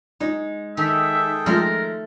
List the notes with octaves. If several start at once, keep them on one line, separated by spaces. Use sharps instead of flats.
G#3 D#4
D#3 G#4 A4 E5 G5
F3 G#3 A3 A#4